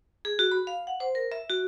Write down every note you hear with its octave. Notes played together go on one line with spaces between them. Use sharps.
G#4
F#4
B5
F5
F#5
C5
A#4
E5
F#4